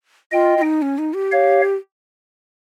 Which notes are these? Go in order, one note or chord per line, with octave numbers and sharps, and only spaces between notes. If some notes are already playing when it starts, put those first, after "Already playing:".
F4 D#5 G5
F4
D#4
C#4
D#4
G4
C#5 F5